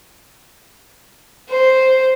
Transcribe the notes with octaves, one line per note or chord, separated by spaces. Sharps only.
C5